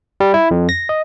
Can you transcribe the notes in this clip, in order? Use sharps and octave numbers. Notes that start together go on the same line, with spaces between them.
G3
E4
F2
A#6
D#5